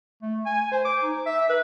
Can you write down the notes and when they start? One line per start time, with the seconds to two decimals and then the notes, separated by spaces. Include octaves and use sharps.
0.22 A3
0.46 G#5
0.72 C5
0.85 D6
1.03 D#4
1.26 E5
1.49 B4